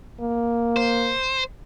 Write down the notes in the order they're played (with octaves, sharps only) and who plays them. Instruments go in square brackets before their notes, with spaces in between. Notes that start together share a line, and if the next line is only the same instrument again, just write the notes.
[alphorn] A#3
[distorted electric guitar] C5